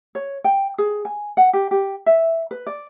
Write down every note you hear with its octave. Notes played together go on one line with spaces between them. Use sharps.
C#5
G5
G#4
G#5
F#5
G4
G4
E5
B4
D5